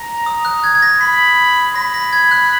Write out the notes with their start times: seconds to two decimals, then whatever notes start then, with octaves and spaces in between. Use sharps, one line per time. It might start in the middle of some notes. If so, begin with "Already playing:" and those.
Already playing: A#5
0.26 D#6
0.45 F#6
0.64 G#6
0.75 G#6
0.82 A#6
1.01 B5 B6
1.75 B5 A#6
1.94 A#6
2.13 G#6
2.31 F#6